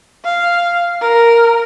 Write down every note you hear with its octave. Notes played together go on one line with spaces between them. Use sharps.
F5
A#4